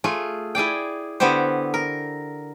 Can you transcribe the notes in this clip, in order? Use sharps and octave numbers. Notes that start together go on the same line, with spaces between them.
A3 F4 G#4
E4 G#4 D5 G5
D3 B3 E4 G4 C5
A#4